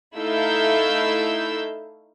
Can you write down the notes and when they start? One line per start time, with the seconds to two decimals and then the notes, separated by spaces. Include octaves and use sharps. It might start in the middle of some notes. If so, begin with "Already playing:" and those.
0.16 A3 D#4 E4 F5 E6 G6